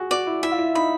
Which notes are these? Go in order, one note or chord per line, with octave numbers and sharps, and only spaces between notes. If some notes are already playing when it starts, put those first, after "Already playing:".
Already playing: F#4 G#4
F#4 D5
E4
E4 E5
F4
E4
D#4 B5